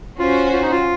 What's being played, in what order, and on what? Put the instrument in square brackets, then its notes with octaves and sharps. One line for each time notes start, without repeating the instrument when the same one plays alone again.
[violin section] C#4 F#4 C5 [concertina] F4
[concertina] F4
D#4
F4